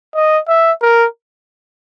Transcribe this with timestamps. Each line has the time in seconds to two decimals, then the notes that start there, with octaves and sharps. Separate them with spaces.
0.15 D#5
0.48 E5
0.82 A#4